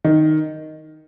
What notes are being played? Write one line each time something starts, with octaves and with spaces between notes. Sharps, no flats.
D#3